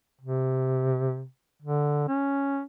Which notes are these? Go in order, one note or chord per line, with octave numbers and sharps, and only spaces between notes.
C3
D3
C#4